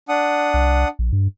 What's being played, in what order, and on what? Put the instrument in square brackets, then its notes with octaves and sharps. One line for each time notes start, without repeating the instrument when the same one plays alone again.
[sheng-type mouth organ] D4 F#5 D#6
[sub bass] C2
A#1
G2